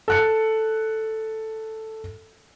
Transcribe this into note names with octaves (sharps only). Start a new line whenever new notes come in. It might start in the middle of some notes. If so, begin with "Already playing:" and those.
A4 F#6 C#7